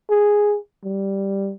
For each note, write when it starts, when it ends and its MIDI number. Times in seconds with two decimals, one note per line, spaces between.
0.10 0.56 68
0.84 1.53 55